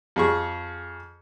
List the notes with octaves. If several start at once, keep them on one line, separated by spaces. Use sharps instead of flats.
F2 G#4 C#6